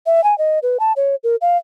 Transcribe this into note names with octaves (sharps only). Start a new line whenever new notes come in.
E5
G#5
D#5
B4
A5
C#5
A#4
F5